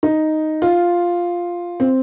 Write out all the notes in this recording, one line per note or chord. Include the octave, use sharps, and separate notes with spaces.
D#4
F4
C4